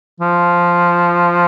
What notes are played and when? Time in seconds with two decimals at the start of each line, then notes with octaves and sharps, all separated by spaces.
0.21 F3